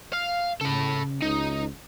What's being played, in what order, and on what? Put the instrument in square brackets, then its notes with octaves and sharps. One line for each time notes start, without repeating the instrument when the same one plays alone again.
[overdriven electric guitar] F5
[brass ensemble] C#3 [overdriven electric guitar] A4 B5
[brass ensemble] C#2 [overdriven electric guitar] D#4